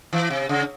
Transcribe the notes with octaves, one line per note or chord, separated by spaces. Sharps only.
E3
C3
C#3